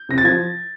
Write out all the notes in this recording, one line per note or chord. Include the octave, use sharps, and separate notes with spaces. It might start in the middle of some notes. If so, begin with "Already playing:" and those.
Already playing: G6
C3 A#6
A6
F3 G#6